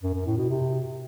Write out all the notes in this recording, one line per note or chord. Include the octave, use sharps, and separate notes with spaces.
F#2
F#2
A2
B2
C3